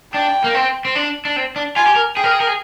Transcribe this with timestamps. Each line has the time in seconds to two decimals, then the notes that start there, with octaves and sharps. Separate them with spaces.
0.14 D4 G5
0.44 A#3
0.55 C4
0.85 C4
0.95 D4
1.25 D4
1.36 C4
1.56 D4
1.76 F4 G#5
1.86 G4
1.95 A#4
2.16 G#4 G5
2.24 A#4
2.31 G#4
2.40 A#4
2.47 G#4